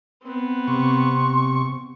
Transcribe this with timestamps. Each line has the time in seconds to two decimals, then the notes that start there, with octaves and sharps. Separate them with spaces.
0.23 B3 C4
0.67 C3 C6 C#6